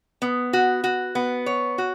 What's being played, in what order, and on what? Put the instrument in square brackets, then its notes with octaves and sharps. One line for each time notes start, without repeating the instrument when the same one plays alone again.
[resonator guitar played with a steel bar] B3
F#4
F#4
B3
C#5
F#4